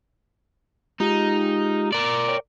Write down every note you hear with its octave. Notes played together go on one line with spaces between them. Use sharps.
G#3 D#4 F4 G4
A#4 D5
C#5 G5